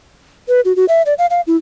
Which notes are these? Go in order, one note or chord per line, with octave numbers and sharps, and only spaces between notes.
B4
F#4
F#4
E5
D5
F5
F5
E4